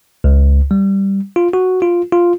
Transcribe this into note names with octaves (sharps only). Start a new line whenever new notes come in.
C#2
G3
F4
F#4
F4
F4